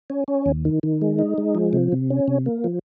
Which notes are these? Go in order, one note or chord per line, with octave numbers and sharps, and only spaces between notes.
C#4
C#4
D#2
D#3
D#3
G#3
D#4
G#3
F3
C3
C3
C#4
C3
A#3
F3